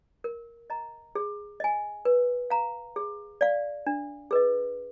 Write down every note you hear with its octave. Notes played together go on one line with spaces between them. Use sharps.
A#4
D#5 A#5
G#4
D#5 G#5
B4
F5 A#5
G#4
D5 F5
D4
G#4 B4 D#5